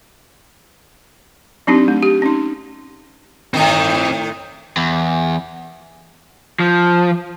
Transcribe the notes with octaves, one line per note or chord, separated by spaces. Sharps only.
F#3 C4 D4 D#4 G4
A3
G4
C#4 D#4
A2 D#3 C4 D#5
E2
F3